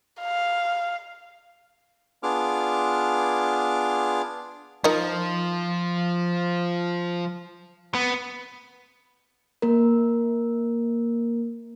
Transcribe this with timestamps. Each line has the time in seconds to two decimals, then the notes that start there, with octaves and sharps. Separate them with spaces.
0.21 F5
2.23 B3 D4 F4 G#4 D6 F6
4.84 F3 D#4 A#4 D#5
7.95 B3
9.62 A#3 A#4